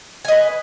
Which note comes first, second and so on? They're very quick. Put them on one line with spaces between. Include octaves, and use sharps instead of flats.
G#5 D#5 B4